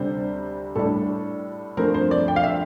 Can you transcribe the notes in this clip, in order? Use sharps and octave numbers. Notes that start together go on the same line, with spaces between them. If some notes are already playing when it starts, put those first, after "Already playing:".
Already playing: D2 C3 G3 D4 C5
A2 G3 D4 A4
G2 F3 A3 C4 A#4
C5
D5
G5
F5
E5